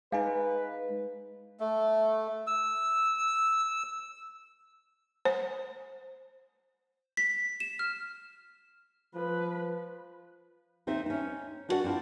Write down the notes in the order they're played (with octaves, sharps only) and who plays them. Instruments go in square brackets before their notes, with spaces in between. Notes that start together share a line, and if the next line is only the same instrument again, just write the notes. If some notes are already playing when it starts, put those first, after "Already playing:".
[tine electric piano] G#3 D#4 [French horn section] B4 [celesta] F5 G#5
[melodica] A3
E6
[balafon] C5
[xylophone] B6
E7
F6
[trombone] F3 [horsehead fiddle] B4
[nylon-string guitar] D#2 C4 D#4 C5 E5
C#4 D#4
D4 E4 F#4 A#4 D5 F#5
C4 D4 E4 F4